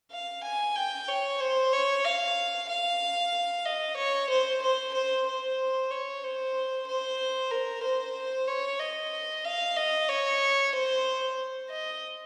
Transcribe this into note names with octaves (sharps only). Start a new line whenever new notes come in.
F5
G#5
G5
C#5
C5
C#5
F5
F5
D#5
C#5
C5
C5
C5
C5
C#5
C5
C5
A#4
C5
C#5
D#5
F5
D#5
C#5
C5
D#5